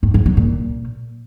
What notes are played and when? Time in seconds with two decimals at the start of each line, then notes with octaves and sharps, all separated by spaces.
0.03 G2
0.14 F#3
0.26 F#3
0.37 A#2